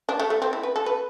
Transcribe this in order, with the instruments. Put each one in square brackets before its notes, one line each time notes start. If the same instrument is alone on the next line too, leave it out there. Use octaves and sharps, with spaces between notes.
[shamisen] D4
A3
A3
C4
E4
B4
A4
B4